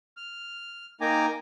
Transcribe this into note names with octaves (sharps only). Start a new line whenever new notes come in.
F6
A#3 D#4 G5 G#5 A#5 D6